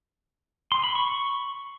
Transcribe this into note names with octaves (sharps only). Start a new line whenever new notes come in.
C6
B5
C#6